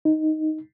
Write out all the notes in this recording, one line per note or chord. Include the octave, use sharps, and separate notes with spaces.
D#4